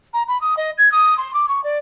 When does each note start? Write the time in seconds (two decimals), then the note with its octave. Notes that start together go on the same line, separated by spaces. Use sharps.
0.13 A#5
0.28 B5
0.41 D#6
0.57 D#5
0.78 G#6
0.92 D#6
1.18 C6
1.34 D6
1.48 C#6
1.64 D5